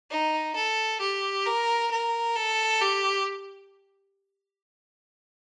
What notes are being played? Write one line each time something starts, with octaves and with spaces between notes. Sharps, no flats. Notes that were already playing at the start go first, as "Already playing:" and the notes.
D#4
A4
G4
A#4
A#4
A4
G4